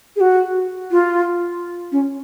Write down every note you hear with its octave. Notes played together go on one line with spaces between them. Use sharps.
G#4
F#4
F4
C#4